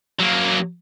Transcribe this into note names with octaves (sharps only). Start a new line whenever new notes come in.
F#3 A#3